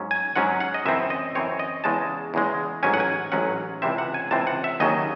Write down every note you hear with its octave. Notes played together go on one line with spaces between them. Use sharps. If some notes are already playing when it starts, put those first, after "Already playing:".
Already playing: G#2 F#3 C#4
G#5
G#2 F#3 C#4 F#5
F#5
D#5
F#2 E3 C4 E5
D#5
F#2 E3 C4 C#5
D#5
E2 C#3 G#3 A5
E2 C#3 G#3
A1 G#2 F#3 C#4 G#5
F#5
G#5
A1 G#2 F#3 C#4 F#5
C#2 C3 E3 C4 E5
F#5
G#5
C#2 C3 E3 C4 A5
F#5
E5
D#2 C#3 F#3 D#5